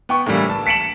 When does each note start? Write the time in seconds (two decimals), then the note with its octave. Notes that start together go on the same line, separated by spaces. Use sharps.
0.09 B3 G5 C#6
0.26 A2 D3 E3 G3 A#3
0.50 A5
0.66 A5 B6 C#7 D7 E7 F#7